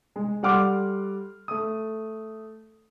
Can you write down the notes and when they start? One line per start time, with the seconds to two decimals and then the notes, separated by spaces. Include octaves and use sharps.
0.16 G#3
0.43 G3 A4 F#5 C6 D6 F6
1.48 A3 D#6